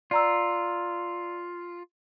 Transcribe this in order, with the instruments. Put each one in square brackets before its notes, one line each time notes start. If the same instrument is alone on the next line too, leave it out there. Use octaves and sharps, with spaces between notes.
[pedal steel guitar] F4 [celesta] D5 A#5 E6